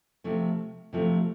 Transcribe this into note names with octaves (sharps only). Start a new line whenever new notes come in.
C3 F3 A3
C3 F3 A3